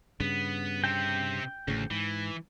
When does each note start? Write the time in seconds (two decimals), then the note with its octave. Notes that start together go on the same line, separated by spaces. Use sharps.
0.20 G2 C#3 B3
0.84 C3 C4 G5
1.68 A1 D2 A2 C#3
1.91 G#2 E3